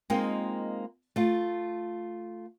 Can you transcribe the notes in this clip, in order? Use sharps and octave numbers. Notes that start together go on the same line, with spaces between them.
G#3 A#3 C4 D#4 F4 G5
A3 F4